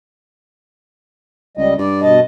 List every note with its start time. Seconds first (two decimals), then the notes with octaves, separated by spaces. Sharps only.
1.57 C#2 G3 D#5
1.78 G2 D5
2.02 B2 D#5 A5